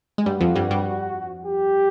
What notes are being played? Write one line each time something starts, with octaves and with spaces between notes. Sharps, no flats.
G#3
G2 G3 F#4
F2 F3
G2 G3
G2 G3
G4